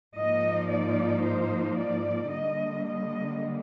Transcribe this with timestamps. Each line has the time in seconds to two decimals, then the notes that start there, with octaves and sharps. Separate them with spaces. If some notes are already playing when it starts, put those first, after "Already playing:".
0.16 G#2 F3 A#3 D#4 D#5
0.70 D5
1.24 C5
1.78 D5
2.32 D3 G3 A#3 D#5
2.85 D#5